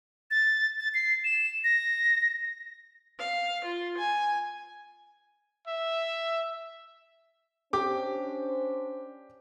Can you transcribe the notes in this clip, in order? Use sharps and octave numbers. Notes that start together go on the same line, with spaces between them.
A6
A6
C7
E7
A#6
F5
F4
G#5
E5
C#4 D4 G4 C5 D6